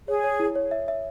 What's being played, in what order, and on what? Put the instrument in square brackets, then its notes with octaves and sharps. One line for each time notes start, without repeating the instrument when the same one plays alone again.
[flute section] G#4 [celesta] C#5
[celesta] C#5
E4
C#5
E5
E5